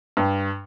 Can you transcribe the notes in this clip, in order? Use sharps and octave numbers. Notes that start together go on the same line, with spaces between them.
G2